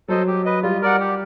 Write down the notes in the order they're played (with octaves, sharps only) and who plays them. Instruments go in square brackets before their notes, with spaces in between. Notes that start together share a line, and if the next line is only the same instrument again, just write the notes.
[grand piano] F#3 [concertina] A4 C5 D#5
[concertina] G4
B4 D#5
[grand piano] G3 [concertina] F4
[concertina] A#4 D5 F#5
G4